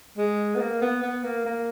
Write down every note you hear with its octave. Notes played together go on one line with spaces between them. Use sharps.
G#3
B3
A#3
B3
B3
A#3
A#3